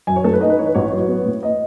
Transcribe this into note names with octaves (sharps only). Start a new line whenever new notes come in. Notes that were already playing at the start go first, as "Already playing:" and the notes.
F#2 G#5
C#5
A3 A4
B4
D#4 D#5
B4
E3 C#5
B4
A1 C#5
F#3
B3
A2
D#5